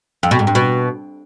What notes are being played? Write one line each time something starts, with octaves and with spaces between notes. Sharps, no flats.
F2
B2
G#2
G2
B2